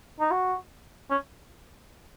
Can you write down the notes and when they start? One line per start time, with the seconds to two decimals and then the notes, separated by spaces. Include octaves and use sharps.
0.20 D#4
0.31 F#4
1.10 C#4